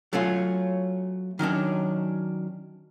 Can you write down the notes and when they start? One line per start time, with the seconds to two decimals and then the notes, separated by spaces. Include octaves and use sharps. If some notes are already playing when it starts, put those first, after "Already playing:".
0.13 F#3 A3 C#4 F4
1.39 D#3 F#3 C#4 D4